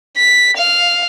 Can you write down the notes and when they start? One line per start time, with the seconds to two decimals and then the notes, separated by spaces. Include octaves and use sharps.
0.17 B6
0.58 F5